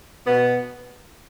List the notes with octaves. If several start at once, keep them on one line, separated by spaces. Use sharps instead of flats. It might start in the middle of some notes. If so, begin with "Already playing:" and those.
B2 B3